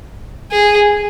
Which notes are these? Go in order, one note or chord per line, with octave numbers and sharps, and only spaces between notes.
G#4